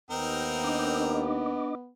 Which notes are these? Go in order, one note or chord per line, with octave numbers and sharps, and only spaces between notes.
D#2 B3 C4 D#4 A#4
D4 D#5 D6